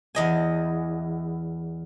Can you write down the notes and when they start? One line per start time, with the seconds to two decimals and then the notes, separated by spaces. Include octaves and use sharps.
0.15 E2 D#5 G#5